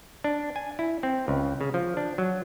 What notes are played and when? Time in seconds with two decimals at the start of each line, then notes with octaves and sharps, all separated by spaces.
0.24 D4
0.56 G#5
0.79 E4
1.03 C4
1.28 C#2
1.61 C#3
1.74 F3
1.97 D4
2.18 F#3